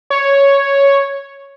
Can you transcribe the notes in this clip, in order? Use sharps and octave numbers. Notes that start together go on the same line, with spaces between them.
C#5